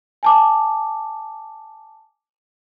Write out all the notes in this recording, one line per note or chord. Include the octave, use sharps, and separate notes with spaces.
G#5 A5 D6